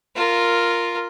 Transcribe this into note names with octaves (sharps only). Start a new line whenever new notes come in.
F4 A#4